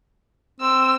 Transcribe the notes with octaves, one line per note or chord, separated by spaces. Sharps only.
C4 E6